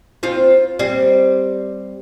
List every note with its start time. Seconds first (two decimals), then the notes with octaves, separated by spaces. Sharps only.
0.23 C4 F4
0.79 G3 C4